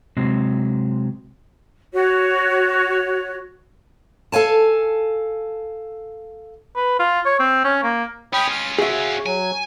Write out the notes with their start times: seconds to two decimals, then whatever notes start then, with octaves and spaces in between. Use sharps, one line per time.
0.17 C3 F#3 G#3 C4
1.93 F#4 C#5
4.32 A4 F5 G#5 A5
6.76 B4
6.99 F4
7.25 C#5
7.39 C4
7.64 C#4
7.83 A#3
8.33 C#4 F4 G5 B5 D#6
8.51 F6
8.78 F#4 G#4 E5
9.26 F#3 G#5